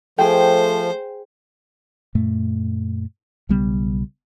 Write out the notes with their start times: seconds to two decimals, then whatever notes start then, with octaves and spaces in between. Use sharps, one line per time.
0.18 F3 A3 G#4 C5 G5
2.15 F#2 A#2 A3
3.49 B1 C#3 G3 B3